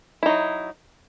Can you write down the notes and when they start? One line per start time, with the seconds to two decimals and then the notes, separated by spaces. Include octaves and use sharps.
0.23 E4
0.26 D#4
0.29 F#3